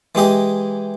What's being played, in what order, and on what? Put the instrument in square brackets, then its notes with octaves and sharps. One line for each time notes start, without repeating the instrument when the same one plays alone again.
[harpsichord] E3 G#3 G4 D#5